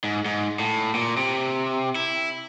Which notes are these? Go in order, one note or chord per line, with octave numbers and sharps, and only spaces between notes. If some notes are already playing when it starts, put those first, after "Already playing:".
G#2
G#2
A2
A#2
C3
E4